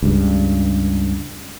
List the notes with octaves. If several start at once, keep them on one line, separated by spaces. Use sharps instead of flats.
C#2 G2